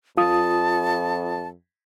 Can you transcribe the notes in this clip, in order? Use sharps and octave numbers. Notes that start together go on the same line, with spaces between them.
F2 F4 A5 D#6